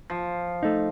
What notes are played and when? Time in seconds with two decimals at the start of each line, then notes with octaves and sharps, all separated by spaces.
0.10 F3
0.63 A3 D#4